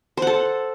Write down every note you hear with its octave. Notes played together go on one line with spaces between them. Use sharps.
A4 C5 F#5